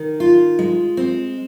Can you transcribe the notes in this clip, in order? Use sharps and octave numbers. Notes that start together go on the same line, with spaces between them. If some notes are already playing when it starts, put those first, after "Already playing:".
Already playing: D#3
F4
G#3
C4